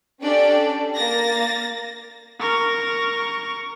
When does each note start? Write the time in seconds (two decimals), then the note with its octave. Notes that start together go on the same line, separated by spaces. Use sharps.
0.21 C#4 D4 G4 A4 D5
0.96 A#3 A6 A#6
2.40 A#4 C#6